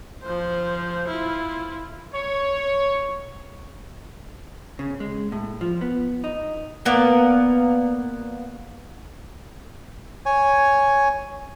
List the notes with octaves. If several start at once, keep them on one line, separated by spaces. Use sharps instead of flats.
F3 C5
E4 F4
C#5
C#3
G#3
A2
F3
B3
D#4
A#3 B3 A#4 D5
C#5 G#5